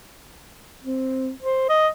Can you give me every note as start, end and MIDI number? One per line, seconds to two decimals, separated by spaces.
0.84 1.30 60
1.43 1.64 72
1.69 1.88 75